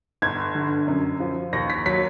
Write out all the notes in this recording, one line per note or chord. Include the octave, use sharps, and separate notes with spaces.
G1 G#6
D3
F#2
F3
D#2 A#6
B6
F#3 B6